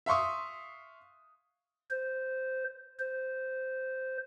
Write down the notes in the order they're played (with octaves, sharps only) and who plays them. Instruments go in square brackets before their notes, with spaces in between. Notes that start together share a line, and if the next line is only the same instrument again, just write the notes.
[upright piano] E5 F5 C6 C#6 D#6
[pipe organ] C5
C5